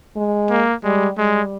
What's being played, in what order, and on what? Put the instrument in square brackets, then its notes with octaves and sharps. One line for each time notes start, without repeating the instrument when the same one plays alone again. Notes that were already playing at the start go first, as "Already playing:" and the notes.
[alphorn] G#3
[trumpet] A#3
[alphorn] G3 [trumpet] G#3
[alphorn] G3 [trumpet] G#3